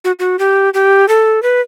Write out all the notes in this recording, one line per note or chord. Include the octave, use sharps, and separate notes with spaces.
F#4
F#4
G4
G4
A4
B4